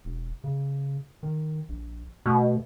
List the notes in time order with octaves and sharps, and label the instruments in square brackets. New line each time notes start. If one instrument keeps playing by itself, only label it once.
[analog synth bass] E1
C#3
D#3
A#1
[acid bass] B2 [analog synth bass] A3